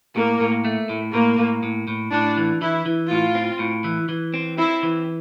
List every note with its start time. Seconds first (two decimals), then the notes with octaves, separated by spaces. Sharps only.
0.16 A2 A#3
0.40 A2
0.65 A3
0.89 A2
1.14 A2 A#3
1.38 A2
1.63 A2
1.88 A2
2.12 A2 D4
2.37 E3
2.61 E3 E4
2.86 E3
3.10 A2 F4
3.35 C4
3.59 A2
3.84 E3
4.09 E3
4.34 C4
4.58 C4 E4
4.83 E3